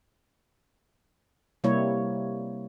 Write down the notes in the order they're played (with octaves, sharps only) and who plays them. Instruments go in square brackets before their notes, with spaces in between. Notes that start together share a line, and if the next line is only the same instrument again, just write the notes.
[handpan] C3 G3 A#3 E4 C#5